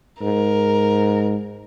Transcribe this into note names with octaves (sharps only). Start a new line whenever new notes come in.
G#2 A#4